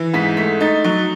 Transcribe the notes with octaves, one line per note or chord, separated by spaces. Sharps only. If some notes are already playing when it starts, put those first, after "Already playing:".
Already playing: E3
G#2 B6
A3 B6
D#4 A6
F#3